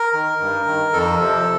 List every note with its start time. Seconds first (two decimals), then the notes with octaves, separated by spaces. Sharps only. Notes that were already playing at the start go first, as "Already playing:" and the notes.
Already playing: A#4
0.14 D#3
0.41 G2
0.67 D#3
0.93 F2 A4
1.19 C3 F3